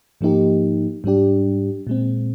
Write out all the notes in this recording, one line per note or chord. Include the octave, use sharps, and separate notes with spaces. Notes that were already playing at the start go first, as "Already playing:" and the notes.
G#2 F3 A#3 D#4 G4
G#2 G3 D4 G4
A#2 G#3 C4